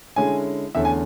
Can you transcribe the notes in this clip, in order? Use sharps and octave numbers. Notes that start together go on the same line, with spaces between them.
D3 G#3 C#4 E4 G#5
E2 D3 A3 C#4 E5
G#5